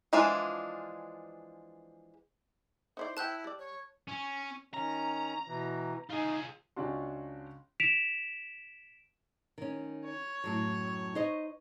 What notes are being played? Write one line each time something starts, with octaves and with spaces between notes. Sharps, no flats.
E3 F3 G#3 D4 F4
D#4 E4 C5 D5
E4 C5 G5 A5 F#6 G6
G3 D5
C#5
C#4
D#3 C#4 A#5
B2 E3
D#4 F4 G#4
C#2 C#4 D4 F4 F#4 C6
B6 D7 E7 F7
D#3 C#4
C#5
F#2 A2 F#3
D#4 C5 D#5